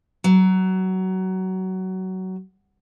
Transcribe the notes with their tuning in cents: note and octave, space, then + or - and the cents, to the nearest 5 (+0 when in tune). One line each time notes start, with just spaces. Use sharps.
F#3 +20